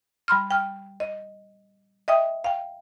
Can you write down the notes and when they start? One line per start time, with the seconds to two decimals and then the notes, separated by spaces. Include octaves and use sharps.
0.28 G3 B5 C6 F6
0.51 G5 F6
1.00 D#5
2.08 D#5 E5 G5 D#6
2.44 F5 G5